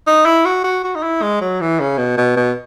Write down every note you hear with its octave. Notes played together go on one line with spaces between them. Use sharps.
D#4
E4
F#4
F#4
F#4
D#4
E4
G#3
F#3
E3
C#3
B2
B2
B2